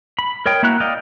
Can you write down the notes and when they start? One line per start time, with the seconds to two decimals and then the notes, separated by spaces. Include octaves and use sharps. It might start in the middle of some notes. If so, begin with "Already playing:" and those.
0.19 B5
0.46 A#4 C#5 D#5 G5
0.63 A#3 E4 F#4 A#5 F#6
0.80 D5 D#5 F5 G5